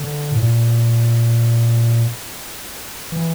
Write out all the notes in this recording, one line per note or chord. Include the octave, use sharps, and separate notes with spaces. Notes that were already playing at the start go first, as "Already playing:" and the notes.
Already playing: D3
A2
A#2
E3